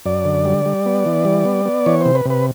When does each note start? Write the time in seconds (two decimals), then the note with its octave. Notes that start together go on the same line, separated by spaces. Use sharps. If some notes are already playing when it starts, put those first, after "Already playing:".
0.06 F#2 D5
0.25 D3
0.45 G3
0.65 G3
0.86 B3
1.06 E3
1.25 G3
1.45 B3
1.65 B3
1.86 E3 C#5
2.01 C3 C5
2.15 B4
2.25 C3 B4